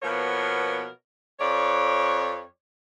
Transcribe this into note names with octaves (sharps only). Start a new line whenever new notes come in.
B2 F3 A#3 B3 A#4 C#5
F2 C#5 D5